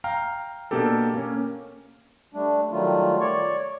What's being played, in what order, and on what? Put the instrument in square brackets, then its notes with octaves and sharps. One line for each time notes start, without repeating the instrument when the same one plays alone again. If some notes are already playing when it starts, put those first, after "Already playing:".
[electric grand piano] F5 G5 A#5 F6
B2 A#3 D4 G4 A4
A#3 C#4
[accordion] G3 A3 D4
D#3 F#3 G3 A3 F4
C#5 D5 C#6